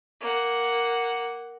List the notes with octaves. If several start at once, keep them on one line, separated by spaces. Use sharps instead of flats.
A#3 F#5